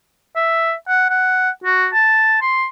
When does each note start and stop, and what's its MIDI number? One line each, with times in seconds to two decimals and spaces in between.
0.36 0.73 76
0.88 1.06 78
1.10 1.50 78
1.64 1.87 66
1.93 2.40 81
2.42 2.66 84